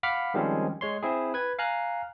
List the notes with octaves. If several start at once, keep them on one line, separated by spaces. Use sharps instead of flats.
F5 F#5 B5 D6 F6 B6
D#3 F3 G3 G#3 C4 C#4
G#3 C#5 C6
C4 E4 G#4
B4 G#6
F5 G#5 A#5 F#6